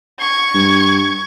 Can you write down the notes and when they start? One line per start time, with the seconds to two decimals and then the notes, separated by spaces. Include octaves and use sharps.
0.21 C#6 G#6
0.54 G2